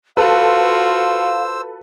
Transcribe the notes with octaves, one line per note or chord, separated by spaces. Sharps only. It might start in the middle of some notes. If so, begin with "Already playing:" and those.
F4 F#4 A4 B4 C5 F5 E6